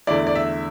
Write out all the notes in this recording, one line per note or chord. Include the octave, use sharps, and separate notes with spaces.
E2 D3 A3 E4 D5
D5
E5